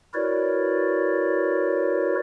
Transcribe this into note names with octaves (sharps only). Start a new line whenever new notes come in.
E4 F#4 A#4 B4 C#5 D5